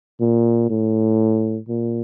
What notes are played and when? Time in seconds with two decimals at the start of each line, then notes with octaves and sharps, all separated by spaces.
0.21 A#2
0.70 A2
1.69 A#2